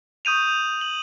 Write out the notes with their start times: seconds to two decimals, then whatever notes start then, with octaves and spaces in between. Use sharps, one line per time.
0.25 C#6 D#6 G6 D#7 F7
0.81 F#7